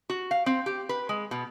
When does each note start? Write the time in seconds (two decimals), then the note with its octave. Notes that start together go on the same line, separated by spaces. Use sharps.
0.10 F#4
0.31 F5
0.46 C4
0.66 G4
0.89 B4
1.09 G#3
1.31 B2